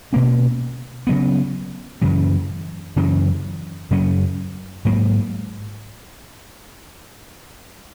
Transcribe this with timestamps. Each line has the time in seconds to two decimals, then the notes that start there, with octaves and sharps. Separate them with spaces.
0.13 B2 A#3 C#4
1.07 C#3 F#3 B3
2.02 F#2 C#3 E3
2.96 F#2 C#3 E3
3.91 F#2 C#3 F#3 C#4
4.85 G#2 F#3 A#3